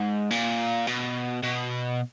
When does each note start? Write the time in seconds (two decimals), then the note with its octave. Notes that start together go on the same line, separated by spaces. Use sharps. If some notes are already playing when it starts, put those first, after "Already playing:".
Already playing: G#2
0.31 A#2
0.87 B2
1.43 B2